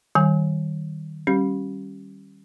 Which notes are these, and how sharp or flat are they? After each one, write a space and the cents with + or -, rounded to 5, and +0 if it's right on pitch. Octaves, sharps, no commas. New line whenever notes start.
D#3 +0 G3 -25 G#5 +0
G3 +0 C#4 -20 G4 -30